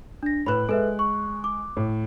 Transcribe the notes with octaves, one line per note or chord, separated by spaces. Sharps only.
D4 A#6
A2 B4 B5 F#6
G#3 A4 B4 E5
C#6
D6
A2